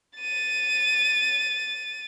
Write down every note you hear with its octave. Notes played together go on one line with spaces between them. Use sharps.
A6 D#7